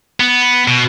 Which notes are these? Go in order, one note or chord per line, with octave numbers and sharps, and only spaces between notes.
B3
B2